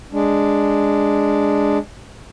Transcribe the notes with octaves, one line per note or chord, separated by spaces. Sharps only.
G#3 D4